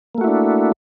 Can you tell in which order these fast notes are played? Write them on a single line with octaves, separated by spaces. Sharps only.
A#3 A3 F#4 E4 D4